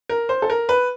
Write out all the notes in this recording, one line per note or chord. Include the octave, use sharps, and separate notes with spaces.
A#4
C5
A4
A#4
B4